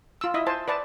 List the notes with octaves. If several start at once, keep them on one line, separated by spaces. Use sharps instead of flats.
F4 E6
E4 D#5 E5
C5 G#5 A5
B4 D5 A5